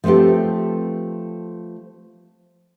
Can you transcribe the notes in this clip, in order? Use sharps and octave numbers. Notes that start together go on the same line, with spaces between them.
F3 A3 B3 C4 G4